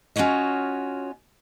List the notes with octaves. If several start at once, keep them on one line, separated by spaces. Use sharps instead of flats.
C#4 F4 F#4 C#5 D#5